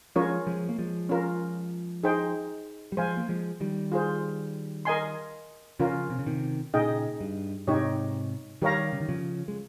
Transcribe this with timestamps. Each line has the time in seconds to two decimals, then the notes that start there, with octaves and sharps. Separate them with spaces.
0.16 F3 G#3 C#4 F4 A#4 C#5
0.47 F3 G#3
0.69 A#3
0.79 F3 G#3
1.09 C#4 F4 A#4
2.03 D#4 G#4 C5 G5
2.92 G3
2.97 F3 G#3 C5 F5 G#5
3.17 A#3
3.29 F3 G#3
3.60 D#3 G3
3.92 F4 G#4 C5
4.85 A#4 D#5 G#5 C6
5.79 C#3 F3 C#4 F4 A#4
6.10 C3
6.19 C#3
6.26 C3 D#3
6.74 A#2 C#3 D#4 G#4 D#5 G5
7.20 G2
7.67 G#2 C3 D#4 G4 C#5
8.62 D#3 G3 G4 A#4 C#5 F5 A#5
8.93 C#3
9.01 D#3
9.09 C#3 F3
9.48 G#3